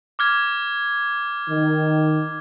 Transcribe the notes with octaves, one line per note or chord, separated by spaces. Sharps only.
D6 F6 G#6
D#3